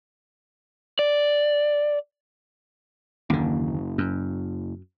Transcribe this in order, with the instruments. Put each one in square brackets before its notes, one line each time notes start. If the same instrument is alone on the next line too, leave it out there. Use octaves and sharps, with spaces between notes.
[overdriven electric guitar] D5
[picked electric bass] F#1 [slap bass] D#2 D3
[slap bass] F#2